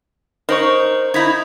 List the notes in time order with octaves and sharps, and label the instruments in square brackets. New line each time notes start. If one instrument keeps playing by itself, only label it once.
[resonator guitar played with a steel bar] D#4 [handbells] A#4 C5 C#6
[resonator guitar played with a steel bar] D#4 E4 [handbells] G#6 B6